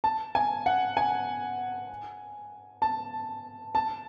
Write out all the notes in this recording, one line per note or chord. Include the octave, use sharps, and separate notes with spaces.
A5
G#5
F#5
G#5
A5
A5